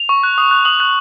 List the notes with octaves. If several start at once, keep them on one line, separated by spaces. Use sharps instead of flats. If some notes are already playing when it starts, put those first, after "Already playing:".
Already playing: F7
C#6
F#6
D#6
F#6
D#6 F#7
F#6